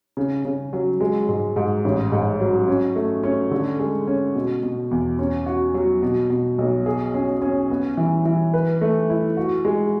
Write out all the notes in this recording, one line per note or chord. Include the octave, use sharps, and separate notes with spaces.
C#3
C#3
F#3
G#3
G#2
G#2
A1
G#2
F#3
C#4
A3
C#4
D3
G#3
C#4
B2
B2
E2
C#4
F#4
F#3
B2
B2
B1
G#4
C#4
C#4
B3
E3
E3
B4
A3
E4
F#4
G#3